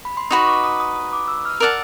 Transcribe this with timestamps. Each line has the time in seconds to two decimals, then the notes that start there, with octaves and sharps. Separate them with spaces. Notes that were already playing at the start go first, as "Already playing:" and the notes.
0.05 B5
0.17 C6
0.31 D#4 F#4 B4 C#6
0.46 D6
0.64 D#6
0.80 D#6
0.96 D#6
1.13 D6
1.28 E6
1.45 F6
1.60 A#4 D5 F#5 A5 E6